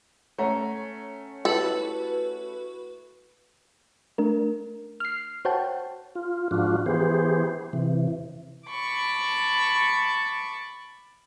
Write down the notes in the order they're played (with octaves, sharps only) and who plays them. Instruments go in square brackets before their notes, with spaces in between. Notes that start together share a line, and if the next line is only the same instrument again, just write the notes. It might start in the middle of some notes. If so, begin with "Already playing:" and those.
[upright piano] A3 C#4 [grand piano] C#5 F#5 A#5
[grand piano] E4 G4 [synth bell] F#4 B4 [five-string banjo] A4
[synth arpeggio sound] A3 D4 A#4
F6 C7
F#4 C5 C#5 F#5 G5 A5
[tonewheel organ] F4
G#2 F3 D4 F4 F#4
E3 B3 G4 G#4 C5
C3 E3
[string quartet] A5 B5 C#6 D6